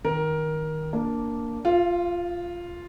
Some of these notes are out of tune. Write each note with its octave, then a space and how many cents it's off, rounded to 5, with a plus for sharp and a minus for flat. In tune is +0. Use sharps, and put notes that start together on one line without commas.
D#3 +0 A#4 +15
A#3 +0 D4 -5
F4 +0 F5 -40